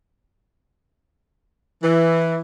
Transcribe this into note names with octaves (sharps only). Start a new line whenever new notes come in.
E3